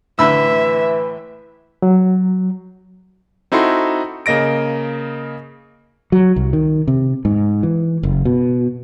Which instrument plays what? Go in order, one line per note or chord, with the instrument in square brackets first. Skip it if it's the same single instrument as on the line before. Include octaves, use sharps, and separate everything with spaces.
[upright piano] A2 [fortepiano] D3 B5 E6 [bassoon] E3 [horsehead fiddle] E5
[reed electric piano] F#3
[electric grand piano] C4 D#4 E4 F#4 A4 C6
C#3 A#3 D#5 A#6 D7
[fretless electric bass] F#3
C2
D#3
C3
G#2
E3
F#1
B2